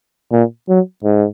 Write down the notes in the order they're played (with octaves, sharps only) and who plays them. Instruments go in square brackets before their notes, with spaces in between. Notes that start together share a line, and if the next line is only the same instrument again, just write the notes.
[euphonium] A#2
F#3
G#2